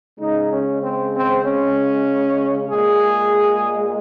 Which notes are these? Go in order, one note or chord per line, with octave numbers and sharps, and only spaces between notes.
C#3 G#3 D#4
C#4
C4
C4
C#4
A#2 G#3 G#4